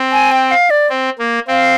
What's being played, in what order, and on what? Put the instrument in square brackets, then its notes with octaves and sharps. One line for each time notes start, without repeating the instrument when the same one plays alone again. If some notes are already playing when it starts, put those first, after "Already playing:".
Already playing: [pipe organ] C4
[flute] G#5
G5
F5
D5
[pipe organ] C4
A#3
[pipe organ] C4 [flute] F5